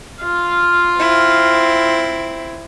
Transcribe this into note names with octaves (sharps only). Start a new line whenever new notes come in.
F4 F5
C4 E4